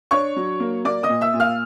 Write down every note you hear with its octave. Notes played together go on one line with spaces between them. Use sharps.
D4 C#5 C#6
F#3
A#3
A#3 D5 D6
D#5 D#6
A#2
E5 E6
A#2
F5 F6